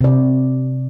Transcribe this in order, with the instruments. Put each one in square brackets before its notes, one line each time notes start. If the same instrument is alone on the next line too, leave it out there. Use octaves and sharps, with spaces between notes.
[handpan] C3 D5